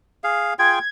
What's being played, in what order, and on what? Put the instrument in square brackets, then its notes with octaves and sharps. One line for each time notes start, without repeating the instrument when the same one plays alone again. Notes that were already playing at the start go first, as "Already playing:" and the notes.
[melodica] G#4 F5
[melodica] F4 G#4 G5 [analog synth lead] G#6